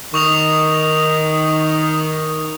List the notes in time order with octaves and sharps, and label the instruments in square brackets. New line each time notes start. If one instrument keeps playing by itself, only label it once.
[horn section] D#3 [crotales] C#6 D#6 F7